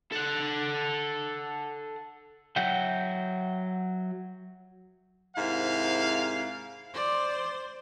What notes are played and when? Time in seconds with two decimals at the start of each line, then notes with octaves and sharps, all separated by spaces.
0.12 A4 F#5
2.56 F#3 E5 F#5 G5
5.36 G#2 C3 A#3 E4 F5
6.94 C5 D5